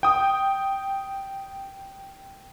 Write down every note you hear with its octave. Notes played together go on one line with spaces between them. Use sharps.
G5 D#6